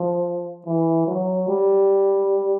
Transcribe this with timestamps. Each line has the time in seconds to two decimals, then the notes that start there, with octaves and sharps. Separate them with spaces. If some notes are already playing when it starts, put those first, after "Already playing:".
Already playing: F3
0.66 E3
1.08 F#3
1.49 G3